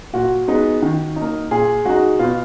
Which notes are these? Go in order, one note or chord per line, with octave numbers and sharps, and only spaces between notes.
A#2 F#4
G#3 B3 D#4
D#3
D#4
A#3
A#2 G#4
G#3 D#4 F#4
B2 F4